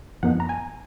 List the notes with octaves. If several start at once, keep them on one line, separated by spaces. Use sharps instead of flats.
F#2 F3 B3 D#4 F#5
A#5
G#5